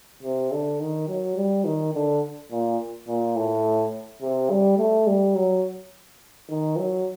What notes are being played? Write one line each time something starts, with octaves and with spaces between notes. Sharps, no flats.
C3
D3
D#3
F#3
G3
D#3
D3
A#2
A#2
A2
C3
G3
A3
G3
F#3
D#3
F#3